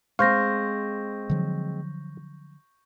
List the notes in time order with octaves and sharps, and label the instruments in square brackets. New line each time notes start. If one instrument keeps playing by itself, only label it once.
[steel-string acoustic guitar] G#3 C4 [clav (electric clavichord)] C5 F5 [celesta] C#6 G6 A#6
[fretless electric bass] D3 F3 F#3